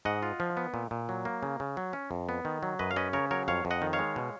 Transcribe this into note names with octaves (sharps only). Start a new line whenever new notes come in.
G#2 D#5 F#5
F4
F3
B3
A#2
A#2
F#3
A#3
C#3
C#3
F#3
C#4
F2
B3
D#3
F#3
F#2 B4 D#5
F5
C#4 B4 D#5
C#3 A#4 C#5
F#3 A#4 C#5
F2 C#5 F5
F2
D#5 F#5
D#3
C#5 F5
G#3
B2